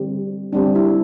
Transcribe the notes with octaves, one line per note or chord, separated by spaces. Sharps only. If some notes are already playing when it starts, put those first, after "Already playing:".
Already playing: D3 G3 C4
D3 G3 C4 D4
E4